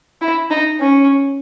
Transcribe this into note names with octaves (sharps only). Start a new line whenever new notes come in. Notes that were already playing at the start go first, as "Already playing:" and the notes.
E4
D#4
C#4